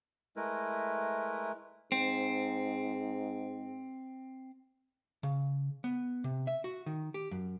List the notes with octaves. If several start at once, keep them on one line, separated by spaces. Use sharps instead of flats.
G#3 A3 E4 A#4 B4
G#2 C4
C#3
B3
C3
E5
F#4
D#3
G4
F#2